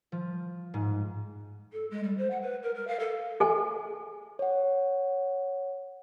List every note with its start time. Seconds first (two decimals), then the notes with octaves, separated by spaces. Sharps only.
0.12 F3
0.74 G#2
1.73 A4
1.91 G#3
2.04 G3
2.18 C5
2.30 F#5
2.42 B4
2.63 A#4
2.75 A#4
2.88 F5
3.00 A4
3.40 G#4 A4 G#5
4.39 C#5 F#5